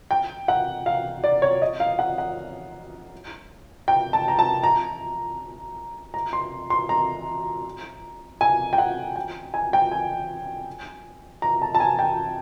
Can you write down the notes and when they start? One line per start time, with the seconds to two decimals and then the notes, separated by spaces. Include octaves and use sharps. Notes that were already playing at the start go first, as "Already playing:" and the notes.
0.11 G5
0.48 F#5
0.86 F5
1.24 D5
1.42 C#5
1.62 D#5
1.80 F5
1.99 F#5
2.18 F#5
3.88 G5
4.13 A5
4.28 A#5
4.39 A5
4.64 A#5
6.14 A#5
6.33 C6
6.70 C6
6.89 A#5
8.41 G#5
8.73 G5
8.78 F#5
9.16 G5
9.54 G#5
9.73 G5
9.91 G#5
11.42 A#5
11.62 A5
11.75 A5
11.80 G#5
11.99 G5